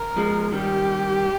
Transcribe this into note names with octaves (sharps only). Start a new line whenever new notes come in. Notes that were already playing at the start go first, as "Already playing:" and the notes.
Already playing: A#4
F3 G#3
D#3 G3 G4